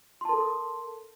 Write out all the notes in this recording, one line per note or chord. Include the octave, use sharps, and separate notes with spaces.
A4 A#4 A5 C6